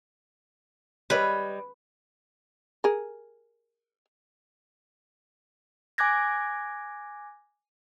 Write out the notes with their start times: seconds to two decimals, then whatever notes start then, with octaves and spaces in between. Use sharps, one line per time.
1.10 G3 B4 C#5 D#5
2.84 G#4 A#4
5.98 G#5 D6 F#6 G#6 A#6